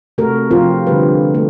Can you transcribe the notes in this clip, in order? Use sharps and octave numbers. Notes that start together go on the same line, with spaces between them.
C3 A3 F#4 A#4
C3 F3 C4 F4 A#4
D3 G3 B4
A3